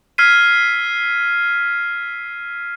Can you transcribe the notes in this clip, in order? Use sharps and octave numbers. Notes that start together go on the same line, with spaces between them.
E6 F6 G#6 B6 C7 D#7